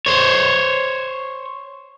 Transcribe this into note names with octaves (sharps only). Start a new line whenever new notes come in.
C5 C#5